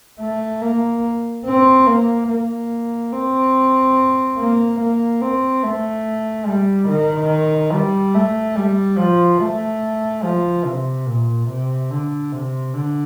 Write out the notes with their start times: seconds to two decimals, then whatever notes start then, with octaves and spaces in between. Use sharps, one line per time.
0.19 A3
0.61 A#3
1.45 C4
1.86 A#3
2.29 A#3
3.12 C4
4.38 A#3
4.80 A#3
5.21 C4
5.62 A3
6.46 G3
6.88 D#3
7.72 G3
8.14 A3
8.56 G3
8.97 F3
9.40 A3
10.23 F3
10.65 C3
11.06 A#2
11.49 C3
11.91 D3
12.32 C3
12.74 D3